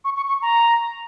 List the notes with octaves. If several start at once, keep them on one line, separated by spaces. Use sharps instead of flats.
C#6
C#6
C#6
A#5